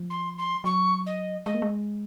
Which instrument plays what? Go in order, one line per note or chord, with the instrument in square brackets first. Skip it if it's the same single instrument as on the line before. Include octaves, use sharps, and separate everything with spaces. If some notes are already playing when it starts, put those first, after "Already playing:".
Already playing: [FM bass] F3
[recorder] C6
C6
[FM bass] F#3 [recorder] C#6
[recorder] D#5
[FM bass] G#3 [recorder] D#5
[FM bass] A#3
G#3